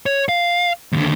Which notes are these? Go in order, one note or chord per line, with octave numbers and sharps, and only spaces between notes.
C#5
F5
D#2 D3